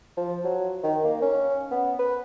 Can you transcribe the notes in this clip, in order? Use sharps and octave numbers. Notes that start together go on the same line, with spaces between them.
F3
F#3
D#3
A#3
C#4
B3
B4